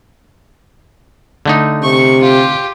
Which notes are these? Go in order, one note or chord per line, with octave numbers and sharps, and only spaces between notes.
D3 A3 D#4
C3 C#6
F4 G4